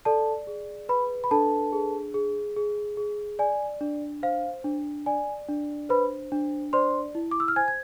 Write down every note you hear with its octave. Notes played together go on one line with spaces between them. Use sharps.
A4 D5 A5
G#4
B4 B5
B5
D4 A4 A5
G#4
G#4
G#4
G#4
D5 G#5
D4
C5 F5
D4
D5 G#5
D4
B4 C5 B5
D4
C5 D5 C6
E4
D6
E6
F6
C5 G#5 G#6
G#6